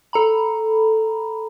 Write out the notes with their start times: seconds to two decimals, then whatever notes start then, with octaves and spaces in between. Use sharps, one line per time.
0.13 A4 A#5 B5